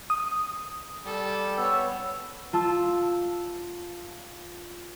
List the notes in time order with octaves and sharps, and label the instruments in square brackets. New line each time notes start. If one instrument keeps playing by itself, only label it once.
[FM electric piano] D#6
[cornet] G3 [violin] A4
[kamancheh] B3 C#5 [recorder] E6
[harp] F4 A5 E6